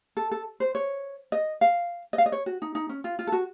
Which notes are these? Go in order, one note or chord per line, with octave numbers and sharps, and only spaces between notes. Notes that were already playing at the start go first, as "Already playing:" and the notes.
A4
A4
C5
C#5
D#5
F5
D#5
F5
D#5
C#5
F#4
D#4
D#4
C#4
F4
F4
A4
F#4